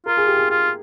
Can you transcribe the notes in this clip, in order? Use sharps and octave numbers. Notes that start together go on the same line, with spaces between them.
F4 A#4
G#4
G4
G#4
F4